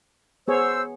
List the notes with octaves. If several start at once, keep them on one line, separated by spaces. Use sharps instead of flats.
B3 G#4 C5 C#5 E6